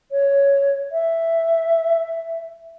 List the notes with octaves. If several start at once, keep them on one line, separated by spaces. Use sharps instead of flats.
C#5
E5